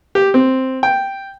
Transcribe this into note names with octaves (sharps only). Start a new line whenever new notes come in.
G4
C4
G5